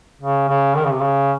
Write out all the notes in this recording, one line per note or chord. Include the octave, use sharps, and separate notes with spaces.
C#3
C#3
D#3
C#3
C3
C#3